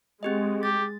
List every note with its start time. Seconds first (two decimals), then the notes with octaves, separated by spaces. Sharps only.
0.23 G#3 C4 G4 D#5
0.63 G4 A6